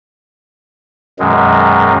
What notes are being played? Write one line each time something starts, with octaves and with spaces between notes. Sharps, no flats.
F#2 B2 D#3 F#3 G#3